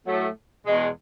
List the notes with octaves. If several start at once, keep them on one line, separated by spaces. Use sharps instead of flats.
A2 F#3 A3
E2 B2 G#3